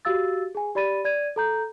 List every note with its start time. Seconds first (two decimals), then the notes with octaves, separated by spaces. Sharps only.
0.05 F#4 G4 F5 E6 A6
0.55 G#4 G#5
0.75 G4 D5 B5 A6 D#7
1.05 D5 G#6 D#7
1.36 A4 A#5 G6